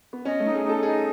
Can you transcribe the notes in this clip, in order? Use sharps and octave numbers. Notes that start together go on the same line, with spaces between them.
B3
C#4 D#5
A3
D#4
G#4
D#4
A4
D#4 G#4